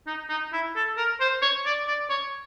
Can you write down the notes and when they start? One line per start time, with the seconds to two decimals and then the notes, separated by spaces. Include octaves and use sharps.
0.07 D#4
0.30 D#4
0.53 E4
0.76 A4
0.97 A#4
1.21 C5
1.42 C#5
1.66 D5
1.87 D5
2.10 C#5